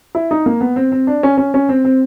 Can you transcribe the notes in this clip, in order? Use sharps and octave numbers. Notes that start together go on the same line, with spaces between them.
E4
D#4
A#3
B3
C4
C4
D4
C#4
C#4
C#4
C4
C4